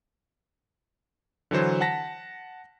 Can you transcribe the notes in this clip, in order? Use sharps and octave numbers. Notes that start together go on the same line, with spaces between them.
D3 E3 F#3 C5
F#5 A5 A#6 B6